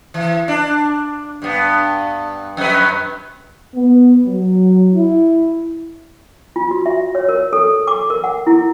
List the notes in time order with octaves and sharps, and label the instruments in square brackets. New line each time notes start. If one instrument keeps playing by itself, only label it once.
[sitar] E3
D4
G2 B3
F2 B4
[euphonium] B3
F#3
E4
[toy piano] F4
F#4
E5
C#5
A#4
A4
D6
A#4
F#5
E4